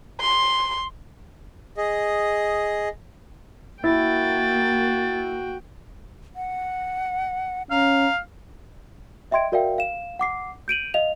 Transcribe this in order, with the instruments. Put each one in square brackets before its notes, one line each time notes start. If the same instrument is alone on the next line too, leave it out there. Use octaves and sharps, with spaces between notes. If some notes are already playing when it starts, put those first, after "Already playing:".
[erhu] C6
[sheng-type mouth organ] G#4 D#5
[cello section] A#3 [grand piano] E4 [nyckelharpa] F#4 G5 [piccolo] A6
[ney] F#5
[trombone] C#4 [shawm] F5 [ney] A#5
[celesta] D#5 E5 G5 C6 G#6 D7
F#4 A#4 D5 E5 F5 G5
F5 E7
F#5 D6 C7
G6 D7 D#7 F#7
D#5 F5 F7